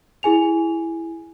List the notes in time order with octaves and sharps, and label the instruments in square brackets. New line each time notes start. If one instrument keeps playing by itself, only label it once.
[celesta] E4 G#4 G#5 F7